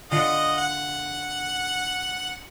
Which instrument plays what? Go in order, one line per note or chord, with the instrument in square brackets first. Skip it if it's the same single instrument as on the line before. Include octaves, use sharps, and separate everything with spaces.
[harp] D3 F4 C7 [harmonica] D#5 F#5
[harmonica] F#5